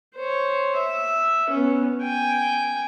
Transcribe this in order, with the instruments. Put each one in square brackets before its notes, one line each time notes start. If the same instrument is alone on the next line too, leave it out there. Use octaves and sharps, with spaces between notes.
[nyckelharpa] C5 C#5
E5
B3 C#4
G5 G#5